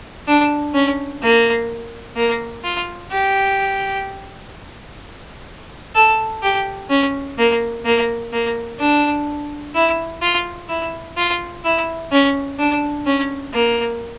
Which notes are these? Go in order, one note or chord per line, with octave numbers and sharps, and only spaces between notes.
D4
C#4
A#3
A#3
F4
G4
A4
G4
C#4
A#3
A#3
A#3
D4
E4
F4
E4
F4
E4
C#4
D4
C#4
A#3